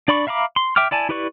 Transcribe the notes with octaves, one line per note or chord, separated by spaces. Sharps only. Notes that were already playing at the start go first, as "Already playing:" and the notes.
D4 D5 B5 C#6
E5 F5 A#5 B5 D6
C6
E5 G5 D6 F6
E4 D5 G#5 A5
E4 G4 B4 D5 C#6